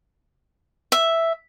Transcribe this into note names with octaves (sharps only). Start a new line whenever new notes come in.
E5